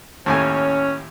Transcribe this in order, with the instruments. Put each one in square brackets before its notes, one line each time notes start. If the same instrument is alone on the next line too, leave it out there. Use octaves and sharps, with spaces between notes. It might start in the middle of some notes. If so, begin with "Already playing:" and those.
[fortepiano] D#2 A2 G#5 [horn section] C#4